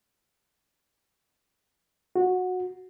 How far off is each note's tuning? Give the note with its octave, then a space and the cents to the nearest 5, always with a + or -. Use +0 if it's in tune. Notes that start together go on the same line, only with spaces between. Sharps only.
F#4 -15